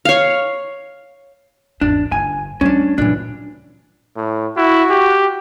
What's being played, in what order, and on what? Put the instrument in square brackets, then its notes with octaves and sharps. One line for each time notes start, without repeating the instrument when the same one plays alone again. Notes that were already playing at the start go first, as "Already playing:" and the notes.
[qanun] C#5 F5
[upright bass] G#1 E2 [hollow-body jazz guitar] D4
[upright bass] G1 [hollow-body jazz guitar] G#5
[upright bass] G3 A3 [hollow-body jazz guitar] C#4 D4
[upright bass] F#2 A#2 [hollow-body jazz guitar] E3 D4
[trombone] A2
[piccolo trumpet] E4 [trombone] F#4
[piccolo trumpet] G4